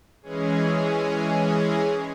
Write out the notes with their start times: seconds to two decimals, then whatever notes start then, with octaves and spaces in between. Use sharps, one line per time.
0.23 E3 G#3 C#4 G#4